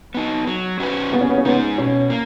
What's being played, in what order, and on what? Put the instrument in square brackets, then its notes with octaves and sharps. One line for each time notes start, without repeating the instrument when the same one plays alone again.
[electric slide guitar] B3 D#4
F#3
C#4 F#4 B4
[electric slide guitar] C#3 [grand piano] B3
[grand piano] C#4
B3
C#4
[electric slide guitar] G#3 D#4 [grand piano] B3
[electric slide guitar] B2 [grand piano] C#4
[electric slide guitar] A#3